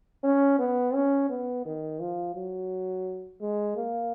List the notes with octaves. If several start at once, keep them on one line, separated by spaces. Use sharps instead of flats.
C#4
B3
C#4
B3
D#3
F3
F#3
G#3
A#3